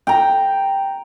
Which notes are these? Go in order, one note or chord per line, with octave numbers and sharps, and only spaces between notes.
G5 A#5